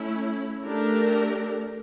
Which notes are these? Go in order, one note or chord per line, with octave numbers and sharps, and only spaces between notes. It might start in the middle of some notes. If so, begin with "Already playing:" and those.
Already playing: A3 C#4 E4
A3 D4 G4 A#4